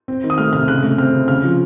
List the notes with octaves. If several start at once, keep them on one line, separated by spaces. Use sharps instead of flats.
C4
D#3
D#6
A3 F6
C3 F6
C#3 F#6
A3
C4 F6
C#3
C#3 F6
F3